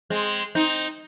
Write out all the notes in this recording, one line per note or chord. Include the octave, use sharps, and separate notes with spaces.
G#3 C4
C4 D#4